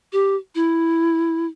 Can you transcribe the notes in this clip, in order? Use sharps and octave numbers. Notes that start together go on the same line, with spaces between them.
G4
E4